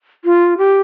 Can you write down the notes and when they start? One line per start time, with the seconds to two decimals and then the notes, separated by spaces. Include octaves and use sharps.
0.25 F4
0.58 G4